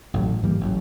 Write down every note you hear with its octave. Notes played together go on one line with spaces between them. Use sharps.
A1 A2 E3 F#3
G#2 E3 G3 A#3
A1 F#3